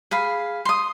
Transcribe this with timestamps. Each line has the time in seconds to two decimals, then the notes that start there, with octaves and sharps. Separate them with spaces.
0.11 G#4 F5 B5
0.65 C6 D#6